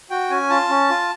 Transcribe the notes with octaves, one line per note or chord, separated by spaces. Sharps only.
F#4 G5
C#4 G#5
F4 A5
C#4
F4